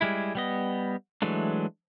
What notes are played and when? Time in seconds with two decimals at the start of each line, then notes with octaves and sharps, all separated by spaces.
0.01 G3 G#3 E4
0.35 G3 B3 D#5
1.22 E3 F#3 G#3 A3 D4